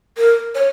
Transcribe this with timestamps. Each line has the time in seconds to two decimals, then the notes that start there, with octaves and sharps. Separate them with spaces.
0.17 A#4
0.55 C#5